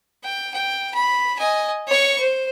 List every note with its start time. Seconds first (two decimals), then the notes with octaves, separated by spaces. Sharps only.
0.23 G5
0.54 G5
0.94 B5
1.39 D#5 G#5
1.87 C#5 C#6
2.20 C5